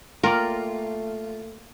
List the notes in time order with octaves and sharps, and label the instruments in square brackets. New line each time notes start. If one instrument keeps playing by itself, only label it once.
[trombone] A3 [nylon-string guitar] A#3 G5 [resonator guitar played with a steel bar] F4 [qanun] A#4 D5